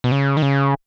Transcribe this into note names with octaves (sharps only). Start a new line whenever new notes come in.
B2
C#3
D#3
C#3